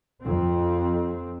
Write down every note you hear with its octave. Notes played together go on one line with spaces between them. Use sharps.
F2 C4